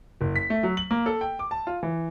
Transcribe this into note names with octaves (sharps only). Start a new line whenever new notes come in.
F#1
B6
A3
F#3
F#7
A#3
A4
G5
D6
A5
F4
E3